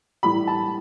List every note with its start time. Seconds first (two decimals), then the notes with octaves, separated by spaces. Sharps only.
0.23 A2 E3 G3 B5
0.47 A5